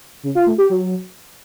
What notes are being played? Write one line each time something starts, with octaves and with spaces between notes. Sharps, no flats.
C#3
F4
A3
G4
F#3